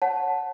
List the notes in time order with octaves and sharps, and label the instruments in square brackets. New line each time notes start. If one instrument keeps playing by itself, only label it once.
[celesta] C#5 F#5 A5